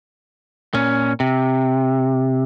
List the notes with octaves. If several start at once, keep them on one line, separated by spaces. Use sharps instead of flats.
A#2 C#4
C3